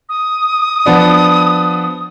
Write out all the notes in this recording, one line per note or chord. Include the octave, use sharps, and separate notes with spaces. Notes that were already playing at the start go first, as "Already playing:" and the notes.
D#6
F3 B3 D4